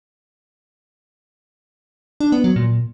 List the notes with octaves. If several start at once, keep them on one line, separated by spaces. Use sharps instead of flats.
D4
B3
F#3
A#2